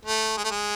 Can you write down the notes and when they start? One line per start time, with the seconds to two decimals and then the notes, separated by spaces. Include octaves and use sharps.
0.05 A3
0.37 G#3
0.44 A3
0.51 G#3